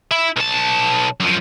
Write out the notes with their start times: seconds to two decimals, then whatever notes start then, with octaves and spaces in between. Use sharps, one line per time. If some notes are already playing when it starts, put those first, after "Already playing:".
0.11 E4
0.37 B1 A5
1.20 F#2 F3